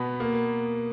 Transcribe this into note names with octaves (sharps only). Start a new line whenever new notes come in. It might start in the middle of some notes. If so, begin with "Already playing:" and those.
Already playing: B2 B3 B5
A#3